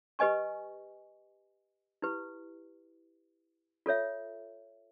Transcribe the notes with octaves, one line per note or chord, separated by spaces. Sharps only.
G4 B4 D#5 G#5 C#6
E4 G4 B4
F4 A4 C#5 E5